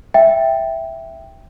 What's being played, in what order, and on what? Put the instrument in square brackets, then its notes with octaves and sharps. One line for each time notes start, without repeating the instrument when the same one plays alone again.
[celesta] E5 G5